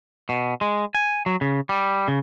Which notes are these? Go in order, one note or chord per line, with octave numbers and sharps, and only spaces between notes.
B2
G#3
G#5
F#3
C#3
G3
C#3